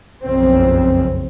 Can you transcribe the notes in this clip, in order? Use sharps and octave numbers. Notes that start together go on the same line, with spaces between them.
F#1 B1 F2 C#3 C4